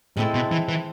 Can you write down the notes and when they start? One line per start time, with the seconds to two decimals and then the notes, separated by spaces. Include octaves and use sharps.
0.17 A2 G#3 C4 E4 A4
0.34 B2
0.51 E3
0.69 E3